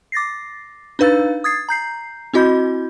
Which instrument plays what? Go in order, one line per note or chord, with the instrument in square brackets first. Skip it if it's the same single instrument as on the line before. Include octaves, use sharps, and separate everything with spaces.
[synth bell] D6 A6 A#6 C7
D4 D#4 B4 F5 E6 A6
D#6 G#6 A6 C7
A#5 G6 C7
C4 E4 F#4 D#5 B5 G6